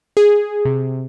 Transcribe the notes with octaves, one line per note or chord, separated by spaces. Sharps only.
G#4
C3